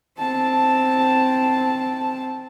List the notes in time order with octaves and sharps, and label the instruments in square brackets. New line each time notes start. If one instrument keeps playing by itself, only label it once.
[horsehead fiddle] C4 A5